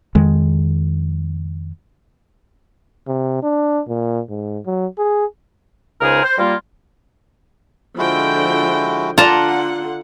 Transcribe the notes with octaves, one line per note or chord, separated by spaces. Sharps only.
F2 D#3 G#3
C3
D4
A#2
G#2
F#3
G#4
C#2 C#3 D#4 G#4 A#4 C5
C5
G3 A#3 F4
D3 F3 G#3 E4 F#4 G5
D3 F4 D5 F#5 A5 A#5 C6